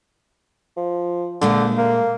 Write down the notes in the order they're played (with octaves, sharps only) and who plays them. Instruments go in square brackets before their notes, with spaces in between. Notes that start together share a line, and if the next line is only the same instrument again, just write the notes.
[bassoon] F3
[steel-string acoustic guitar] A#2 G#3 A3 [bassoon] D3
[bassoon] A#3